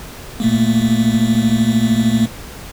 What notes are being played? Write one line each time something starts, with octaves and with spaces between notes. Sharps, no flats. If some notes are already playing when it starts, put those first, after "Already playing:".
A#2 A3 A#3